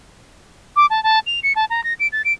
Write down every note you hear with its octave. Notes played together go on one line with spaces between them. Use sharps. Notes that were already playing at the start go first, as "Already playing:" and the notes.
D6
A5
A5
F7
C#7
A5
A#5
A#6
D7
A6
D7